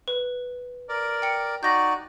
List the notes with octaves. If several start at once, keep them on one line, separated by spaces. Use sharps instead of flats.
B4
A#4 D5
G5 C#7
D#4 F#4 D5 G6 A#6